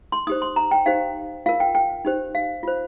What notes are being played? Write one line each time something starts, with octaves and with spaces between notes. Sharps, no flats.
C6
D#4 G4 C5 D#6
C6
A#5
G5
D#4 G4 C5 F5
F4 A#4 F5
G5
G5
D#4 G4 C5
F5
F4 C5